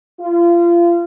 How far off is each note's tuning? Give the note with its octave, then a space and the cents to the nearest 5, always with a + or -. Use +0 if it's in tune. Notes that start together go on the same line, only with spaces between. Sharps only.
F4 -30